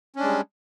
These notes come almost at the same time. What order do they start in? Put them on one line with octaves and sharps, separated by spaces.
C#4 D4 G#3 G3